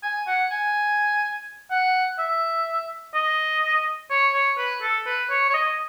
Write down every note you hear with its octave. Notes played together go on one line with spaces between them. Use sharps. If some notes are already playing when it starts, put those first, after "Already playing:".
G#5
F#5
G#5
F#5
E5
D#5
C#5
C#5
B4
A4
B4
C#5
C#5
D#5